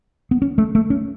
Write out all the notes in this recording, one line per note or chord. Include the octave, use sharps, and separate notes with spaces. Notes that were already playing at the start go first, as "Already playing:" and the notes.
B3
C#4
A3
A3
C#4